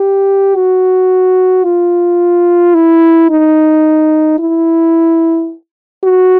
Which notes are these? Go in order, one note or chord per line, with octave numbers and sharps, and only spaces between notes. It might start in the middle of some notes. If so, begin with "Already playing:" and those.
Already playing: G4
F#4
F4
E4
D#4
E4
F#4